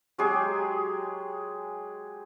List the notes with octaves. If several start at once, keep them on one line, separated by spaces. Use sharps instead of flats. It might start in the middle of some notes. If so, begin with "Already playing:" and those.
F#3 G#3 G4 G#4